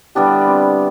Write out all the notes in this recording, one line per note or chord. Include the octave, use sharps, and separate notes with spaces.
D3 G3 B3 D4 E4 G4
C4